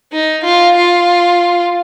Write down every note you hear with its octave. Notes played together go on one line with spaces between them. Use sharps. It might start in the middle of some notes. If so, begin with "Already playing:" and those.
D#4
F4
F4